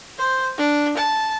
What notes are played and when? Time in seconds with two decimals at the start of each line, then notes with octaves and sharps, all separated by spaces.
0.19 C5
0.58 D4
0.97 A5